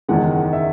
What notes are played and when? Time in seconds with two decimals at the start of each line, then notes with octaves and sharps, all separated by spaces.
0.09 F#1 E2 D#3 G#3 F#5
0.53 E5